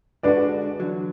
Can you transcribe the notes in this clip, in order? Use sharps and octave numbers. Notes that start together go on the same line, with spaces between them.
D3 G#3 D4 F#4 B4 D5
E2 D3 F#3